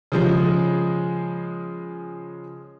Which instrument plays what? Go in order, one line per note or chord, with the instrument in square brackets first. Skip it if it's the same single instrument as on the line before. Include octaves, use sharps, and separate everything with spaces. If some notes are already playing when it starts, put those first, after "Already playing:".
[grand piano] C#3 F3 G#3